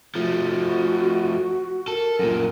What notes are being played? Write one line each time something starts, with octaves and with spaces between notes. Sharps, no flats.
F3 A3 F#4
A4 A#4
F#2 A#2